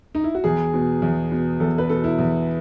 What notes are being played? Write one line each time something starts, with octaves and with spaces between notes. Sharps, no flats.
D#4
E4
F#4
E2 G#4
B2
E2
B2
E2 A4
B4
B2 A4
E4
E2